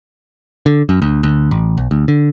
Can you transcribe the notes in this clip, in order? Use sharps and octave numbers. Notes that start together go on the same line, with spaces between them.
D3
F#2
D2
D2
A1
B1
D2
D3